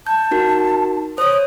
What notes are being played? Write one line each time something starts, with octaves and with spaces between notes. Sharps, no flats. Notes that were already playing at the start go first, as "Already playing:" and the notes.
A5 G6
D#4 F#4 A#4
C5 C#5 D#6